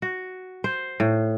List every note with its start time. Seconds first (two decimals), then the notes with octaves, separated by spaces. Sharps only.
0.02 F#4
0.64 C5
1.00 A2